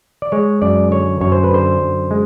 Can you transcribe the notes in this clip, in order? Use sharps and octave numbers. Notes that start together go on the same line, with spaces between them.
D5
G#3 C#5
F#2 D5
D3 C#5
F#2 C#5
C5
B4
D3 C5
F#2
G#3